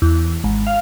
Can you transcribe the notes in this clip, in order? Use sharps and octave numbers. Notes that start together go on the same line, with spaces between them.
E2
G#1
F5